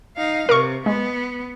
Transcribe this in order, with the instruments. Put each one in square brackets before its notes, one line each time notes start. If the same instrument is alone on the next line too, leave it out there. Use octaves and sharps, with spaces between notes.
[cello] D#4 F5
[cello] C3 [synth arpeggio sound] A#4 C#6
[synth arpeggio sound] G#3 [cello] B3